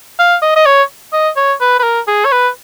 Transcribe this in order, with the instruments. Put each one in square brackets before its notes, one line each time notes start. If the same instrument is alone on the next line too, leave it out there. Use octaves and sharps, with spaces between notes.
[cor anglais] F5
D#5
D#5
C#5
D#5
C#5
B4
B4
A#4
G#4
C#5
B4